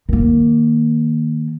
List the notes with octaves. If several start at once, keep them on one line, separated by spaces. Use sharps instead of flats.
D#3 A#3